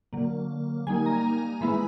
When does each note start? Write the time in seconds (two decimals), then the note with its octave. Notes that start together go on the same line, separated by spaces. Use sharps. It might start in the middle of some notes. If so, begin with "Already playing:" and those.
0.13 D3 F#3 A#3
0.87 G3 A#3 D#4 G#5
1.06 A#5
1.61 E3 G#3 B3 E4 B5